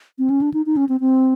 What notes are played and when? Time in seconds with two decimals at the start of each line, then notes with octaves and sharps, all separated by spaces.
0.19 C4
0.30 C#4
0.42 D4
0.54 D#4
0.66 D#4
0.77 C#4
0.89 C4
1.00 C4